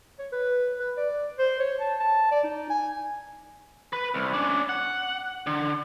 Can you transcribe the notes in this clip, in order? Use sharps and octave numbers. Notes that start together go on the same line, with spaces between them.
C#5
B4
B4
D5
C5
C#5
A5
A5
D5
D#4
G#5
B4
C2
C#4 D4
F#5
D3